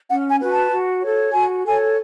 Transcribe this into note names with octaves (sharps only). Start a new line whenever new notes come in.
C#4 F#5
G#5
F#4 B4
A5
F#4
A4 C#5
F#4 G#5
A4 C#5 G#5